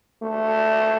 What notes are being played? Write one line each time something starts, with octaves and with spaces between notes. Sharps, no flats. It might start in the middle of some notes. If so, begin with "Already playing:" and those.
A3